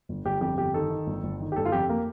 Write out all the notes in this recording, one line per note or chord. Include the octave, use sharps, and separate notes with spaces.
G1
G1 G4
F2 G4
G1 G4
D#3 A4
D#3
G1
G1
D#3
G4
G1 A4
F4
F2 G4
A#3